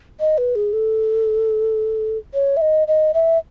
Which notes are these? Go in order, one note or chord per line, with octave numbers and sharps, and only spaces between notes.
D#5
B4
G#4
A4
C#5
E5
D#5
D#5
E5